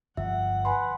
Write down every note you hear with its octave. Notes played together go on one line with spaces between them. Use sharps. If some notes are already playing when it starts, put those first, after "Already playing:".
G1 F3 E5 F#5
B4 G#5 B5 C6